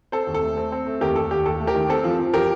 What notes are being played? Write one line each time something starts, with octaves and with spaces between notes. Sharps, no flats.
C4 A4 C5
D#2
A4
A3
C4
C4
A3
D#2 G4 A#4
D#2 A4
D#2 G4
D#2 A4
A3
G4 A#4
D#3
C4 A4
F3
F3
F3 G4 A#4